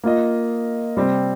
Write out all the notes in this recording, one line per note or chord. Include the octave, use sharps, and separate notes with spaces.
A#3 F4 D#5
C3 G3 C4